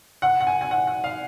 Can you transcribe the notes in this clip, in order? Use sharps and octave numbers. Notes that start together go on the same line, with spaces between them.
F#5
F#5
G#5
G#5
F#5
F#5
F5